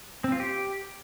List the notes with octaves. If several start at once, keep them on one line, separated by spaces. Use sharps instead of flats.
C4
F4
G4